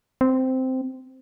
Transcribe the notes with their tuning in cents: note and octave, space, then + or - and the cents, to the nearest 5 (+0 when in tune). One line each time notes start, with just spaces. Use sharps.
C4 -10